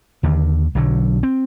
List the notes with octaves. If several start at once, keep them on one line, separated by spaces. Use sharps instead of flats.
D#2 D3
B1 D3 F#3
C4